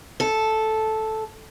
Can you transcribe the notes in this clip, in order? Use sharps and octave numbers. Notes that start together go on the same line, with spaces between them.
A4